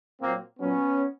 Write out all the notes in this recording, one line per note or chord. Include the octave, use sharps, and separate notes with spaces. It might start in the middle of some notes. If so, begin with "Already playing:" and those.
A#2 F#3 A#3 C4
A#2 F#3 B3 C#4